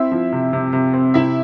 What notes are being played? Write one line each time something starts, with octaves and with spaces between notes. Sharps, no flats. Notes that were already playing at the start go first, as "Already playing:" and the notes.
Already playing: C4 E4 E5
F3
C3
C3
C3
C4
C3 E4 E5